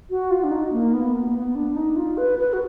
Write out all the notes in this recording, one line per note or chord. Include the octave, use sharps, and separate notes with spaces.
F#4
F4
D4
D#4
A#3
B3
A#3
B3
D4
D#4
F4
B4
B4
F#4